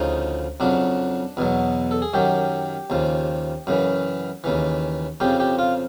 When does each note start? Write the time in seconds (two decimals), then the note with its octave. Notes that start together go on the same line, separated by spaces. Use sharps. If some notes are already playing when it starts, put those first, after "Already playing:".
Already playing: D2 C#3 F3 D#4
0.60 F2 C#3 F#3 D4
1.37 E2 B2 F#3
1.91 A4
2.02 G#4
2.14 F#2 D#3 F#3 G4
2.90 D#2 C#3 F3
3.67 F#2 C#3 E3
4.44 D#2 C#3 E3
5.20 F2 C#3 F3 G4
5.40 G4
5.59 F4